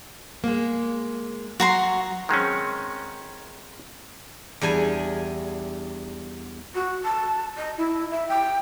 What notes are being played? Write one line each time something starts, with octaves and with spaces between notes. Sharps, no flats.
G#3 A#3
F#3 F#4 A#5 C6
D#3 G#3 C4 C#4
E2 G3 D4 G#5
F#4
A5
D#5
E4
E5
G5